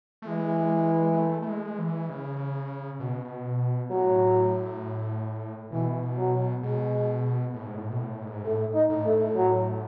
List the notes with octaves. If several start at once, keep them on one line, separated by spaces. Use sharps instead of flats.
A3
E3 G#3
G#3
A3
A3
G#3
E3
C#3
B2
A2 F#3
B2 E3
F#3
B2 G#3
A2
G#2
A2
B2
A2
G#2
A2 A3
D#4
A2
A3
A2
F#3